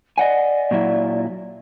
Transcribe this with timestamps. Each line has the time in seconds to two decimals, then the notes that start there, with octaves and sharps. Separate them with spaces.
0.18 D5 D#5 F#5 G#5
0.71 A#2 F#3 E4